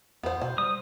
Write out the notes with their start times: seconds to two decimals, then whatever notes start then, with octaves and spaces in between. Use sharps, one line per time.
0.23 E2 B3 C5
0.42 B2 C5
0.58 G3 D#6